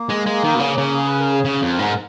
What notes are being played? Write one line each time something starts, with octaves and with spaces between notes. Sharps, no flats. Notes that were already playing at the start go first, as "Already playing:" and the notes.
Already playing: A#3
G#3
G#3
D#3
B2
C#3
C#3
G#4
B4
A#4
G#4
C#3
F2
A#4
G#2
A#4